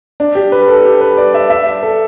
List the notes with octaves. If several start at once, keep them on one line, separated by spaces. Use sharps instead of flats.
D4
G4
B4
A4
G4
B4
D5
E5
E5
D5
A4